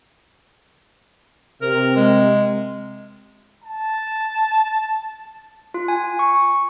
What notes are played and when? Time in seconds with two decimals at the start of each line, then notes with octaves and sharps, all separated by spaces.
1.62 C3 A#4
1.96 G#3
3.64 A5
5.74 F4
5.88 G#5
6.19 C#6